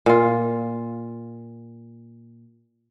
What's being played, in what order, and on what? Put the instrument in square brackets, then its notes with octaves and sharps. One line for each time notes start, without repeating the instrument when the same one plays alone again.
[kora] A#2 F4